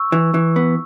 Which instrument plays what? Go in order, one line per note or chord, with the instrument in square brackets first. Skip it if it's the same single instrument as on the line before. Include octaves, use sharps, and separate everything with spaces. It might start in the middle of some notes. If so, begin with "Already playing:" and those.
Already playing: [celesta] C#6 E6
[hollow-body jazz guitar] E3
E3
B3